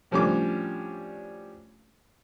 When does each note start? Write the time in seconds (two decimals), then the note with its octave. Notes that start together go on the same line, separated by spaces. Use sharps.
0.11 A2 F3 G3 C#4 D4 D6